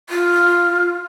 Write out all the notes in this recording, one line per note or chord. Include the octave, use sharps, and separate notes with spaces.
F4